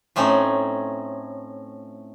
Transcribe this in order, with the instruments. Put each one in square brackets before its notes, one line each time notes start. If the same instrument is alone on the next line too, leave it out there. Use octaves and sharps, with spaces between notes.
[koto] A2 A3 C4 C#4 D#4